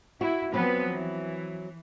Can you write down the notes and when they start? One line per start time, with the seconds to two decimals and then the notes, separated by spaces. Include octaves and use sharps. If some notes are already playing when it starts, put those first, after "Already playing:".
0.21 E4 F#4
0.54 F3 F#3 B3 C4 B4
0.93 E3